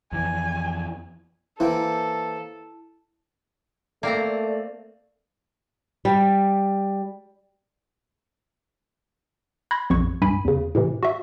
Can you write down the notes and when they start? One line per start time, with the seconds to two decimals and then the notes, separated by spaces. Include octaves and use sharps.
0.12 F2 E3 G#5
1.60 E3 A#3 C4 E4 A4
4.03 A3 A#3 C4 D5 A#5
6.05 G3
9.71 B5 C6 F#6 G#6 A#6
9.90 A#1 F2 C#6 G#6
10.22 C2 G2 G#5 B5 B6 D#7
10.45 E2 C#3
10.75 A2 C3 E3
11.03 F#4 E5